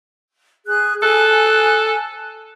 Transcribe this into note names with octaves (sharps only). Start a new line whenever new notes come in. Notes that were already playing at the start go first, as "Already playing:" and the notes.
G#4 F#6
A4 G#5 F#6